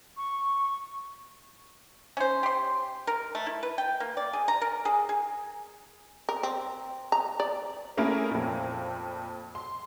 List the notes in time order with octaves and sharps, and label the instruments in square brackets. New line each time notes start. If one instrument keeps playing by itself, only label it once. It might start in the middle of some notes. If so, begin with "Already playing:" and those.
[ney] C#6
[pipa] C#4 C5
G4 C6
A#4
A3
E4
B4
G5
A#3
D5
G#4
A#5
A#4
G#4
G#4
[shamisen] A#4
C4
A#5
D5
[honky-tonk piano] A3 A#3 C#4 E4 G#4 A#4
F2 A#2
C6